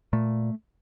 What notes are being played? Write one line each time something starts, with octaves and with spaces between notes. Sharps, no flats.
A#2 A3